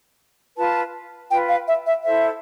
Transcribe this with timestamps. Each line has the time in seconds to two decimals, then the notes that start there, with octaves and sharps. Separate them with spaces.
0.57 F4 B4 A5
1.30 F4 B4 G5
1.49 F5
1.67 E5
1.86 E5
2.04 E4 A4 C5 E5